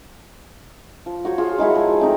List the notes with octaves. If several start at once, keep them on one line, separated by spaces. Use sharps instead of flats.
F3
F#4 C5 C#5
F4 G#4
D#3 G#3 E4 F#4
F3
A3 C4 D#4